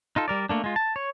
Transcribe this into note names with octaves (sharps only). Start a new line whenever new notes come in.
D#4 F4 A4
G3 A#4 D5
A3 A#3 D4
G#3 F4
A5
C#5